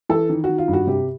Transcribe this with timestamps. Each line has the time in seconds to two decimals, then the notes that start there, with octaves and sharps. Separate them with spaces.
0.09 E3 A4
0.29 D#3
0.44 F#4
0.49 D#3
0.58 F4
0.68 G2
0.73 F#4
0.87 C3 G4